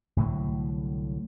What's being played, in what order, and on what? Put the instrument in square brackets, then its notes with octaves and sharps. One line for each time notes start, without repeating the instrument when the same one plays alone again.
[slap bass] C2 A2 D3 F#3